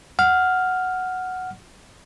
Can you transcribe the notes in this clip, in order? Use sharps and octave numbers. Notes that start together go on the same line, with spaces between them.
F#5 F6